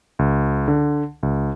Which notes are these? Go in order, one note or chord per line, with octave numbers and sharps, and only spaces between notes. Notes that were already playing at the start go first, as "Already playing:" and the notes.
C#2
D3
C#2